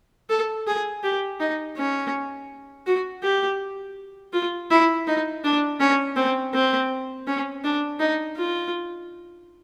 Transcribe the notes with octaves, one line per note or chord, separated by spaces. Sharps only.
A4
G#4
G4
D#4
C#4
F#4
G4
F4
E4
D#4
D4
C#4
C4
C4
C#4
D4
D#4
F4